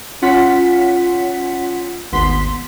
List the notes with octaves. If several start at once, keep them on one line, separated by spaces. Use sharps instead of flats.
C#4 F4 F#5 B6
G#1 D#2 B3 C6 B6